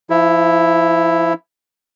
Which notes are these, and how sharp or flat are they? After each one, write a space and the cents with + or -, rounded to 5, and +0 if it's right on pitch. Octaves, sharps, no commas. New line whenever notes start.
F3 -30 E4 +0